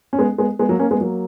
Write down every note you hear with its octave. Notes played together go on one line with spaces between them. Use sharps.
C#4
G#3 B3
G#3 B3
G#3 B3
F#3 A#3
A#3 C#4
G#3 B3
F#3 A#3